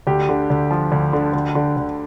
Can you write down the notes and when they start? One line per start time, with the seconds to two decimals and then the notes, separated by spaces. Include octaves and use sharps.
0.07 D2 G4
0.29 D3
0.50 D2
0.71 F3
0.92 D2
1.13 D3
1.33 D2
1.55 D3
1.77 D2